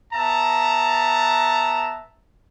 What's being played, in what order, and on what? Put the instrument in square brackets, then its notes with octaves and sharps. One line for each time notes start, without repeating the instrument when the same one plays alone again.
[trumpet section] B3 E5 A5 A#5